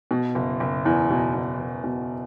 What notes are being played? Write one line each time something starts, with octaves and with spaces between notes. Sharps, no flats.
B2
F#1
F#1
E2
B2
E2
F#1
B2